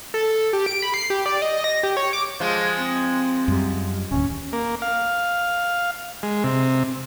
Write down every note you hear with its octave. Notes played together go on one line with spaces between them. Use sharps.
A4
G4
D7
B5
C7
G4
D5
D#5
A#6
G4
C#5
D6
F3 G#3
C4
F#2 G3
D1 D#2 C#4
A#3
F5
G#3
C3